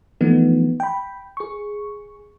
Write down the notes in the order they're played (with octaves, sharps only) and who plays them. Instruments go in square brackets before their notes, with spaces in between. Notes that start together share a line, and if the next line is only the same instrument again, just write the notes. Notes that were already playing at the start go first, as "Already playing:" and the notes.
[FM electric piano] E3 F3 A3 B3 D#4
G5 B5
G#4 C#6